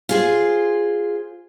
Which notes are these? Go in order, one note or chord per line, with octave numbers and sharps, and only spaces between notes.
F4 G#4 C5